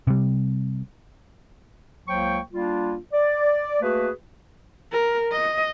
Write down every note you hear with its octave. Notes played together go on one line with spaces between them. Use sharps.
C3 G3
C#2 F#3 A#3 C5 G5 C#6
G3 A#3 D4 F4
D5
A3 A#3 F#4 G#4 B4
A#4
D#5